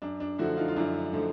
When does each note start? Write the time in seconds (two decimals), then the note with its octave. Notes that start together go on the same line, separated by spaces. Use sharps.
0.02 F#2 D4
0.20 D4
0.39 D3 F3 A3 E4 F#4
0.57 D#4 F4
0.68 F4
0.76 F#2 D4 E4
1.13 D3 F3 A3